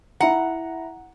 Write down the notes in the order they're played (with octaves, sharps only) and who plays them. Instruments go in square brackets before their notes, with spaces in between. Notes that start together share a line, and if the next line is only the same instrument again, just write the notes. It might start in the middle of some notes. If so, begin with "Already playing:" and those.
[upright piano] E4 A#5 [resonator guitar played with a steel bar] F#5